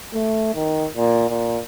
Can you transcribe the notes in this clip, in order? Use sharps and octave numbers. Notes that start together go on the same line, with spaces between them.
A3
D#3
A#2
A#2